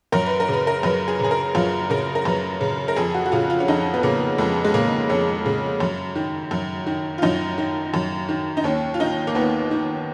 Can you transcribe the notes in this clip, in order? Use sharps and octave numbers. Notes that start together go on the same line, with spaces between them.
F#2 A#4
B4
A#4
C#3
B4
A#4
F#2 B4
G#4
C#3 G#4
A#4
F#2 F4
C#3 A#4
A#4
F#2 B4
C#3
A#4
F2 G#4
F#4
F#4
C#3 F4
F4
C#4
F2 D#4
B3
C#3 A#3
F2 G#3
G#3
C#3 A#3
F2 C#4
C#3
F#2
D#3
F#2
D#3
F4
F#2 D#4
D#3
F#2
D#3
D#4
D#2 C#4
F4
D#3 D#4
A#3
D#2 B3
D#3